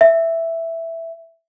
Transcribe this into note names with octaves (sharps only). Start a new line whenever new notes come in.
E5